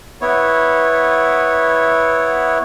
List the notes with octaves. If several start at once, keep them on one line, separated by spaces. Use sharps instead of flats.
B3 E4 C#5